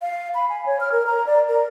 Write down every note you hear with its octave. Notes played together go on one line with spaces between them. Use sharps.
F5
B5
G#5
C#5
F6
A#4
A#5
D5
A#4